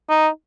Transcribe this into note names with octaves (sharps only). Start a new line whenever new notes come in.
D#4